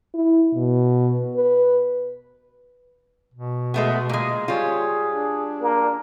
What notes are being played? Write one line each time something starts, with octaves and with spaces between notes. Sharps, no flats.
E4
B2
B4
B2
G#3 A3 B3
A#2 G#3
G3 F4 G#4 C#5
D4
A#3